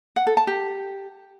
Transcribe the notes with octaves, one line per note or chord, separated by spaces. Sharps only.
F#5
A4
A5
G4